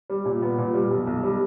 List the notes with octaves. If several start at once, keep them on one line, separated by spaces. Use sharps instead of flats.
G3
A#2
B3
A#2
G3
B1
B1
G3